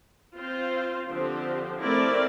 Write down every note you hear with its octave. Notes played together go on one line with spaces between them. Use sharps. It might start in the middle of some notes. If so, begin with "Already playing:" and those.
C4 F4 C5
D3 F3 C4 G4 C5
A3 C4 E4 A#4 D5